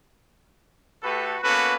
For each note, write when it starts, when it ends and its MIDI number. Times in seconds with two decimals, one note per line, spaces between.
1.03 1.38 57
1.03 1.38 66
1.03 1.38 67
1.03 1.38 69
1.03 1.38 71
1.42 1.76 58
1.42 1.76 59
1.42 1.76 61
1.42 1.76 66
1.42 1.76 69
1.42 1.76 71